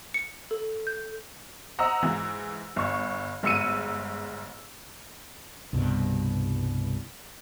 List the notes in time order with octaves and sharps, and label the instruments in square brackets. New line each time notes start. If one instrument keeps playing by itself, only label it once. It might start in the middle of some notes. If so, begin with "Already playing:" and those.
[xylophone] C#7
A4
G6
[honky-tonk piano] C5 D#5 F#5 A#5 E6
G#2 E3
G1 C#6
G1 G#2 E6 C#7 D#7
[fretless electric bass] C2 G2 B2